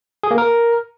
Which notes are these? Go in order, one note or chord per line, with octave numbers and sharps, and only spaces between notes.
G#4
A#3
A#4